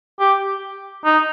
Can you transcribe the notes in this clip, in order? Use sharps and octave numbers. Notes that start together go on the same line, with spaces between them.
G4
D#4